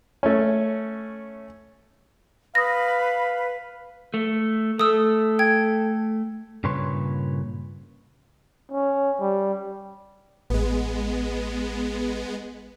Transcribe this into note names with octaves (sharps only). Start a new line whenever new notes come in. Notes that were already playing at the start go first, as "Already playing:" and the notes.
A3 C#4
B4 F5 B5 D#6 A#6
A3
A3 A4 D#6 E6
G5 G#6
G2 A#2 C#3 B4 C#5 C6
C#4
G3
A1 G#3 B3